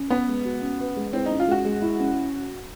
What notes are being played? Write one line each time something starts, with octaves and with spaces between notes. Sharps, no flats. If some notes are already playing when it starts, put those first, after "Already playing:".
Already playing: C#4
B3 B4
G#3
F#4
C#4
B4
G#3
C4 E4
C#4 D#4
F4
G#3 F#4
G#3
E4
C#4